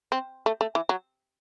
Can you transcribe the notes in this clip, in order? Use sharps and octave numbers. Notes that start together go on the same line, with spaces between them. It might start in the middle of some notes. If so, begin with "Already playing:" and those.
C4
A3
A3
E3
F#3